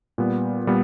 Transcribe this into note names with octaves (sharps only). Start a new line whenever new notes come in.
A#2 G3 B3
A#2 G3 B3